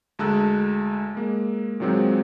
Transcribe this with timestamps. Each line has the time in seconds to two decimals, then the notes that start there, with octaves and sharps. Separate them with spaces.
0.19 D2 G#3 A5 A#5 E6 F#6
1.15 G#3 A#3
1.80 A#2 D#3 F#3 G#3 C4